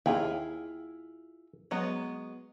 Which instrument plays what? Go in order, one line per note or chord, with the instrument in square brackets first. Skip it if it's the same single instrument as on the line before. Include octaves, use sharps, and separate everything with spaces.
[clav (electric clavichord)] D#2 [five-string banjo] E4 F4 G#4
[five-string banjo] F#3 G#3 B3